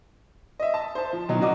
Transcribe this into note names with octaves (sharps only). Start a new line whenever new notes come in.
D#5 E5
A5
C5 A5
F3
B2 D#3 F#3 D#4
C#3 F#3 F#4 D#5 D6